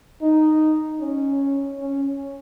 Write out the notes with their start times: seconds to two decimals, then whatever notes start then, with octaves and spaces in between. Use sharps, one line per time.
0.22 D#4
1.00 C#4
1.79 C#4